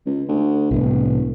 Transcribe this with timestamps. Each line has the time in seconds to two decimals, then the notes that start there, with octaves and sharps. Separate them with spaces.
0.06 C#2
0.28 D2
0.71 E1 C2 A2